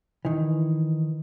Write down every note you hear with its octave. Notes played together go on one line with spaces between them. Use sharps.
D#3 E3